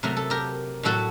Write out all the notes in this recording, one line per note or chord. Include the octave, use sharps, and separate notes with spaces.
C3 F#3 A3 A#4
A4
G4 A#4
A2 F#3 A3 F#4 A4